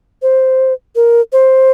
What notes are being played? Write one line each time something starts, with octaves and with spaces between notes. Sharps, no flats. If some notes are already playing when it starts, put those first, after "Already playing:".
C5
A#4
C5